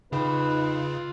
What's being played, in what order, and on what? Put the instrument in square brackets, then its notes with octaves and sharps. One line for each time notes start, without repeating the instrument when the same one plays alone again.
[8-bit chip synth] C#3 [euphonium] D#4 [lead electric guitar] F4 G5 [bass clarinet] B4